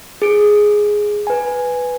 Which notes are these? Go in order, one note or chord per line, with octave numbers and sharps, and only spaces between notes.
G#4 D7
B4 G#5